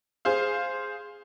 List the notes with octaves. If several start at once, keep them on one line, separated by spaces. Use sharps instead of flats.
G#4 C5 F5